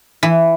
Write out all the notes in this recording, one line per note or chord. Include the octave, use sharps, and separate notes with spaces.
E3